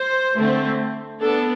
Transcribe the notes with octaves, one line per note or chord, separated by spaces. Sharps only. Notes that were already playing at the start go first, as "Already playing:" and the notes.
Already playing: C5
D3 A3 C4
B3 D4 A4